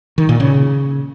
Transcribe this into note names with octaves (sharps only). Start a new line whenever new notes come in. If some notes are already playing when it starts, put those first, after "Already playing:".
D#3
A#2
C#3